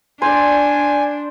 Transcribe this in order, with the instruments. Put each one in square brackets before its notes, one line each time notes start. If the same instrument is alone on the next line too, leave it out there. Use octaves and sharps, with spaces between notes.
[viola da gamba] D4 [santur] C5 D5 [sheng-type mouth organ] G#5